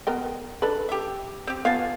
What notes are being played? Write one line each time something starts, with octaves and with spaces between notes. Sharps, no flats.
B3 A#4 G5
D4 A4 B4
G4 E5
C4 G4
B3 F4 F5 G#5 A5